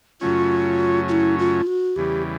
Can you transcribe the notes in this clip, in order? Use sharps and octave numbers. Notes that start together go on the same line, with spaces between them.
F#2 C#3 F#3 A3 C#4 F4
F4
E4
F4
F#4
E2 C#3 E3 G3 G4